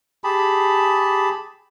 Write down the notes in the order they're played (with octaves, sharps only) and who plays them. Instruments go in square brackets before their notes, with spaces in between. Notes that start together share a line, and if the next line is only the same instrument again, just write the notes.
[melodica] G4 G#4 A5 B5